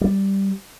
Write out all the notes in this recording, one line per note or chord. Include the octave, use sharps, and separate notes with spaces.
G3